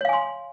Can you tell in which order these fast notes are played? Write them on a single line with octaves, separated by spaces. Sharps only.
C#5 F5 G#5 C6